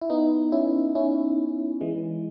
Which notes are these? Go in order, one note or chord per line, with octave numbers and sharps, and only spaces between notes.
E4
B3 D#4
C#4 E4
C#4 E4
E3 G#3